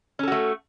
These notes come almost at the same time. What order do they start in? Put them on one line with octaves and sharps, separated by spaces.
C#4 A4 F#4 A3